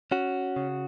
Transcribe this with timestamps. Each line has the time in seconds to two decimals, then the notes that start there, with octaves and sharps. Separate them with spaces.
0.11 C#4 F#4
0.56 C#3